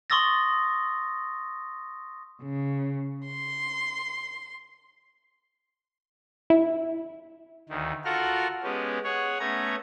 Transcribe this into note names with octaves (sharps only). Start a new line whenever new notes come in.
C6 C#6 D#6 E6 A6 A#6
C#3
C6
E4
D2 D#3
F4 F#4 A4 A#4 F#5 F6
G#3 B3 C#4 G4
G#4 C#5 F#5
A3 B3 C#4 A#5 G#6